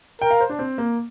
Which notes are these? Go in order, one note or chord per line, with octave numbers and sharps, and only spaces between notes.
A#4 G5
F5
C5
D4
C4
A#3